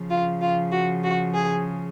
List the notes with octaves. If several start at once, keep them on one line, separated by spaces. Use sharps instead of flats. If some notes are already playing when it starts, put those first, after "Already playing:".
Already playing: C#3 F3
F4
F4
F#4
F#4
G#4